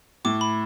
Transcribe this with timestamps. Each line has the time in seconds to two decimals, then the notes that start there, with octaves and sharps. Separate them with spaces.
0.25 A2 D6
0.41 B5